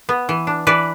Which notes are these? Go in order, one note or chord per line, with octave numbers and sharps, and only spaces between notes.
B3
E3
D4
E3 B4 D5